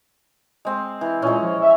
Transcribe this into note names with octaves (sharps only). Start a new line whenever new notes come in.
G#3 C4
E3
A#2 G#3 C#4
F3
E5